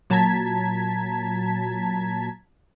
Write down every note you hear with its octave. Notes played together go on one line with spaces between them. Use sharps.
A#2 F#3 A5 A#5 G#6 B6